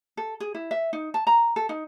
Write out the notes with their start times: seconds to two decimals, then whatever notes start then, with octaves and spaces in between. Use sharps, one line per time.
0.17 A4
0.40 G#4
0.55 E4
0.71 E5
0.93 D#4
1.14 A5
1.27 A#5
1.56 A4
1.69 D#4